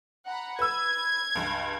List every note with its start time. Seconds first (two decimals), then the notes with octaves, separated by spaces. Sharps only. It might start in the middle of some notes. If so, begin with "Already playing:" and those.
0.25 F#5 A#5 B5
0.59 B4 E6 G#6
1.35 C#2 G2